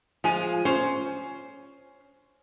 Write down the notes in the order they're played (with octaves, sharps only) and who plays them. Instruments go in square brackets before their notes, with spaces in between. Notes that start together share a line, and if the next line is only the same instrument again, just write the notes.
[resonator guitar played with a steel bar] F3 G#3 G#5 [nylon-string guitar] F4
[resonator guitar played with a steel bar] C#4 [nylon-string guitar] C5